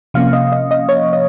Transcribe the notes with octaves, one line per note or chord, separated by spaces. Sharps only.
C3 F3 A#3 C#4 F5
D#5
D#5
D#5
C#5
D#5